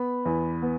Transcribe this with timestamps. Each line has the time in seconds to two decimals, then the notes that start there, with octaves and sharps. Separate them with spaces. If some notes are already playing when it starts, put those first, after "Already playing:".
Already playing: B3 B5
0.25 E2
0.62 B3